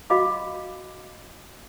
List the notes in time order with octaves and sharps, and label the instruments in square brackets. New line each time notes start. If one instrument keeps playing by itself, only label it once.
[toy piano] F#4 D#5 F5 B5 D6